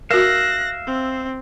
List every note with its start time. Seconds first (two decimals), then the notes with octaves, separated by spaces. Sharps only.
0.11 F#4 A#4 E5 F5 F#6 A#6
0.87 C4